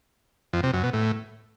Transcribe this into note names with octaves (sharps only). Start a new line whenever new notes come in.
F2
C3
F#2
B2
A2